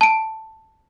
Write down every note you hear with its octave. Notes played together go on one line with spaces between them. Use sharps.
A5 D7